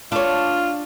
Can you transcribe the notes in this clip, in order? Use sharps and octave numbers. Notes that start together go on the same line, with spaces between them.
D4 F4 C#5